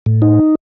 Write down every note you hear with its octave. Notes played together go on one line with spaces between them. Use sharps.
A2
D#4